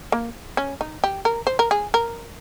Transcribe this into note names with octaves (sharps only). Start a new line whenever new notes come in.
A#3
C#4
D#4
G4
A#4
C5
A#4
G#4
A#4